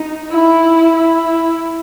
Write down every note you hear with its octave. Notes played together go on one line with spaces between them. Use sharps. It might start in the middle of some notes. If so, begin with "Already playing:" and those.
Already playing: D#4
E4
E4